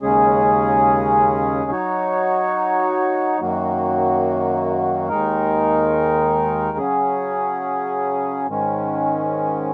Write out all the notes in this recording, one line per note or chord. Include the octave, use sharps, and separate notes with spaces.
D#2 C#3 G#3 C#4 G#4
F#3 D#4 F#4 C#5
F#2 D#3 F#3 A#3 F#4
D#2 D#3 G#3 D#4 A#4
C#3 F#3 C#4 G#4
G#2 D#3 G#3 C#4